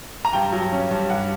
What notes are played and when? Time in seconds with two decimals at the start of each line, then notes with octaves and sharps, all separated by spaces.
0.25 A#5
0.33 G2 G5
0.52 F#3
0.72 C#4
0.91 G2
1.10 G2 F#5